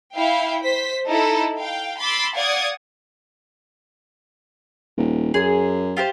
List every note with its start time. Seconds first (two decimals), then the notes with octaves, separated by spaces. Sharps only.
0.15 E4 F5 G5
0.62 C5 B6
1.07 D#4 E4 A4
1.58 F5 G5
2.00 B5 C6 D6 E6 A6
2.36 D5 F5 F#5 D#6 G#6
4.97 D#1
5.34 F#2 G#4
5.97 F4 G4 C5